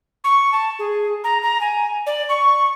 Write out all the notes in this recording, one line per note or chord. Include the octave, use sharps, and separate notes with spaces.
C#6
A5
G#4
A#5
A#5
G#5
D5
C#6